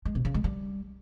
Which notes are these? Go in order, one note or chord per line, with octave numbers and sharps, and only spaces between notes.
G#3
C3
C#3
G#3
G3